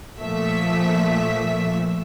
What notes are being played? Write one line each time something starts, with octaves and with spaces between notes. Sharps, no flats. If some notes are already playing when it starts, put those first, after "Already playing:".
A#2 F3 A3 E5 B6